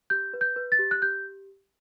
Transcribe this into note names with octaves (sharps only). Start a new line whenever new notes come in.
G4 G6
B4
G6
B4
A6
G4
F#6
G4 G6